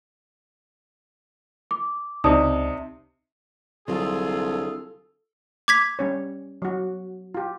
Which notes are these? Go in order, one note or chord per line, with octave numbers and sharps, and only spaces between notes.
D6
C#2 C3 D#4 D5 A5 D#6
C2 D3 F#3 F4 G#4 A4
D6 G#6 B6
G3 C#4 C#5
F#3 F#4
F4 G4